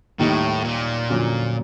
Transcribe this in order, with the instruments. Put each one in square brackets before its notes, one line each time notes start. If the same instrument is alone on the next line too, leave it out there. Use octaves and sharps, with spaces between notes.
[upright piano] D#2 D#3 G3 A#3 D#4 [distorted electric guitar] A2
[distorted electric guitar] A#2
[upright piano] F2 D3 F#3 A#3 C#4